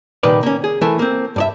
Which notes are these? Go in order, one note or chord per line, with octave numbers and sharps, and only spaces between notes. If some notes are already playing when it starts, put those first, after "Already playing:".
C2 A#2 D#3 G3 B4 D5
A#3 C#4
G#4
E3 A3 A#4
A#3 C4
G2 D5 E5